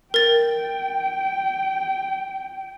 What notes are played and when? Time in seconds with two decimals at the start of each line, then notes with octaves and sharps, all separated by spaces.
0.14 A#4 G5 A6